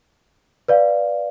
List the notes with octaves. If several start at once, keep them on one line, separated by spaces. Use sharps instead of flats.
B4 D5 F5